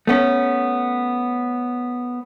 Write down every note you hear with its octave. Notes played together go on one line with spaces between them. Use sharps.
A3 B3 C#4